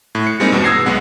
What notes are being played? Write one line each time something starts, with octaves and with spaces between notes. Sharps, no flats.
A2
C#7
G3 G#3 A#3 C4 D#4 A#4
E2 G2 B2
D#6 E6 G#6 A#6 C7
B1 G#3 B3 F#5